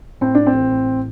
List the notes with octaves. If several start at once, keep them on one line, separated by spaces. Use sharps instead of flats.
A2 C4
A2 D4
C4
A1
A2